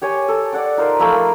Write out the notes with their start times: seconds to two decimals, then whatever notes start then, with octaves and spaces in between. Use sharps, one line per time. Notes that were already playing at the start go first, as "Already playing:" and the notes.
0.02 G4 C#5 G5 G#5
0.28 A4
0.53 D5 F#5 D6
0.77 D#4 F4 A#4 C5
0.99 F3 A3 A#3 B5